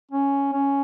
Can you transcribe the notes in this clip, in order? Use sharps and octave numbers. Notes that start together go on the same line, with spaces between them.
C#4
C#4